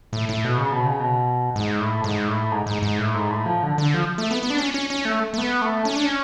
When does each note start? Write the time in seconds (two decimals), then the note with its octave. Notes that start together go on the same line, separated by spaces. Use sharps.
0.13 A2
0.29 A2
0.44 B2
0.58 C#3
0.72 B2
0.86 C#3
1.00 B2
1.56 G#2
1.80 A2
2.04 G#2
2.28 A2
2.51 G#2
2.67 G#2
2.82 G#2
2.99 A2
3.15 G#2
3.31 A2
3.46 F3
3.63 D3
3.78 D3
3.94 F3
4.18 A3
4.31 B3
4.43 B3
4.50 D4
4.58 C#4
4.74 C#4
4.90 C#4
5.05 A3
5.34 A3
5.38 B3
5.62 A3
5.85 C#4
5.96 D4
6.05 C#4